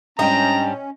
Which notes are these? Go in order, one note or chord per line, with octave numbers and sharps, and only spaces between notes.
G#2 G3 C#4 D4 D#5 G5 A#5